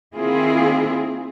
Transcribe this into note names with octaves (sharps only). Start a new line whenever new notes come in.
D#3 A#3 C4 E4 F4 G#4